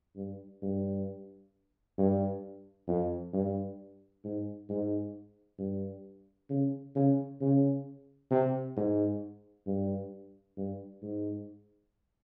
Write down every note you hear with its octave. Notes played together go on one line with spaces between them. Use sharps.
G2
G2
G2
F2
G2
G#2
G#2
G2
C#3
C#3
C#3
C3
G#2
G2
G2
G#2